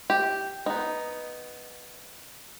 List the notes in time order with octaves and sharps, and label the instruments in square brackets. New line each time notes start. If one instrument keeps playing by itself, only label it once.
[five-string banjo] G4
B3 D#4